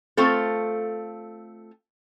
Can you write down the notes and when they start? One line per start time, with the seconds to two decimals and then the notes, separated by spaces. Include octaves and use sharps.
0.17 A3 C4 F4 A4